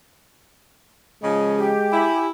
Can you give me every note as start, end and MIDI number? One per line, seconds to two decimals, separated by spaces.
1.23 1.72 49
1.23 1.72 53
1.23 2.09 56
1.23 1.72 61
1.23 1.65 75
1.57 2.27 67
1.92 2.30 64
1.92 2.27 80